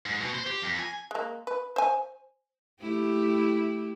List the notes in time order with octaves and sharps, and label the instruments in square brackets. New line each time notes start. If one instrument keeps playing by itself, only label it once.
[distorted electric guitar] G#2
B2
C5
G4
F2
G#5
[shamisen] G#3 A#3
B4
C5 G#5
[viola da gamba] A3 E4 G4